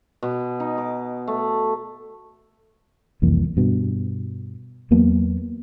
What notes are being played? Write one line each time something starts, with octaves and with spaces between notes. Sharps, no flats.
B2
D#4
D6
A3
C2 F2 E3 A#3
G2 B2
E2 F#3 A#3 B3